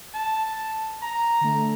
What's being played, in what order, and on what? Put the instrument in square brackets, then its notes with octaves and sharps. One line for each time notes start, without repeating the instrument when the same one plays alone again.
[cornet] A5
A#5
[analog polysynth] D3 A3